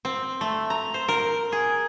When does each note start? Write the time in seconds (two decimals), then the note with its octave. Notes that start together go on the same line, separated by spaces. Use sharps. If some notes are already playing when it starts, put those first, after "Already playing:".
0.05 C4
0.41 A3
0.70 A#5
0.94 C5
1.08 A#4
1.52 G#4